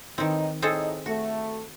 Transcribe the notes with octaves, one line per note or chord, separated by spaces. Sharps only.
A2 D#3 E3 C4 D#4
A2 C4 D#4 G#4 A4 D#5
A3 F#4